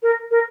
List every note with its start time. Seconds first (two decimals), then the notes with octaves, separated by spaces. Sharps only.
0.03 A#4
0.31 A#4